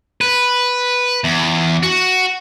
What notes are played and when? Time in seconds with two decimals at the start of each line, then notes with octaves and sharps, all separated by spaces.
0.21 B4
1.24 E2
1.83 F#4